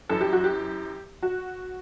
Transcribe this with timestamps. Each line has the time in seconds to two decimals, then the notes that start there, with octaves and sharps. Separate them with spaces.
0.09 F#2 E3 A4
0.21 G4
0.33 F#4
0.44 G4
1.23 F#4